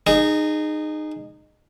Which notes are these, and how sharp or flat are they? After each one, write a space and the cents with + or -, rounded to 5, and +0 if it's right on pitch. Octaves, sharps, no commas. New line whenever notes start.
D#4 -20 G#4 +0